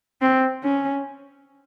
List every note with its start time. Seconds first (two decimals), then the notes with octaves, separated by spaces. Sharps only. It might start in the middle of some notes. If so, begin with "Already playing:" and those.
0.21 C4
0.63 C#4